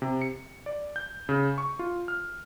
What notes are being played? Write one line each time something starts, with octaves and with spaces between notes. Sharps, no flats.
C3
C#7
D5
G6
C#3
C#6
F4
F6